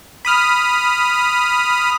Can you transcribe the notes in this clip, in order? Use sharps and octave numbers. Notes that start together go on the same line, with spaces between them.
B5 D#6 F6